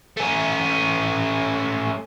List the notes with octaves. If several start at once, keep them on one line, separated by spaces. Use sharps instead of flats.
A3 C#4